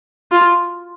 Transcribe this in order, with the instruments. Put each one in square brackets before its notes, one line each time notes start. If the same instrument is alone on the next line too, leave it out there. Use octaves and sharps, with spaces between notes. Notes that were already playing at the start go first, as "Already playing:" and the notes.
[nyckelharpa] F4